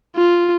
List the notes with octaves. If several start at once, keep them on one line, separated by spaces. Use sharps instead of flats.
F4